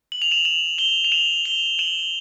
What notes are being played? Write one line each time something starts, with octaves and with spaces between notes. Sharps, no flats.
F#7
F7
E7 F#7
E7 F#7
F7 G7
F7
E7 F#7
F7 G7
E7 F#7